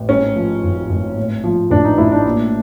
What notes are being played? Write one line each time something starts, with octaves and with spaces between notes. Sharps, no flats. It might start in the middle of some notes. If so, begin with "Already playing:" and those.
Already playing: A1
G#2 C#4
F3
G#1
G#1
A2
F3
A1 D4
D#4
A1 E4
D4
A#2